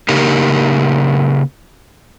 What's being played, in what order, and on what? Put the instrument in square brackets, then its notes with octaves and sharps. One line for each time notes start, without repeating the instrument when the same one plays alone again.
[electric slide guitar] C#3 A#3 D#4 G4 A#4